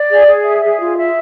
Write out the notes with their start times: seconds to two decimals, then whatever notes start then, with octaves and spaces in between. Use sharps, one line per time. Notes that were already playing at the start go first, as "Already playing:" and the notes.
Already playing: D5
0.10 G#4
0.27 G#4
0.45 E5
0.63 G#4
0.80 F4
0.98 E5